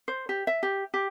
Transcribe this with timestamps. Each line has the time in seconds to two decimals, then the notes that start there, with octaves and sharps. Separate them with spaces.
0.08 C5
0.29 G4
0.47 E5
0.63 G4
0.94 G4